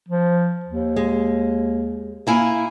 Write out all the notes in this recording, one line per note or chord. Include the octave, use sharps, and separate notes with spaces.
F3
D#2
G#3
A#3 E4 G#5